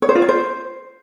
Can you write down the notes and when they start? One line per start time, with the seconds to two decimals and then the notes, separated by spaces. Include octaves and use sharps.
0.02 C#5
0.09 C5
0.15 F4
0.22 C#5
0.29 C5